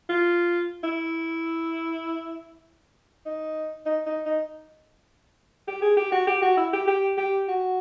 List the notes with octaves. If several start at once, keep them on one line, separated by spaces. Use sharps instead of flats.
F4
E4
D#4
D#4
D#4
D#4
G4
G#4
G4
F#4
G4
F#4
E4
G4
G4
G4
F#4